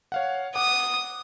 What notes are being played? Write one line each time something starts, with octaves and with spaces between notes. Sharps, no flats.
C#5 F5 F#5
F#5 D6 D#6